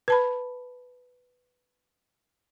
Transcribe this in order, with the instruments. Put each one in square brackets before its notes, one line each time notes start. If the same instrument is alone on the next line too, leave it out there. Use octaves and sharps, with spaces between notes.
[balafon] B4 A5 B5